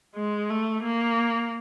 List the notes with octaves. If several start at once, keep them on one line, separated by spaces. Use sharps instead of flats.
G#3
A3
A#3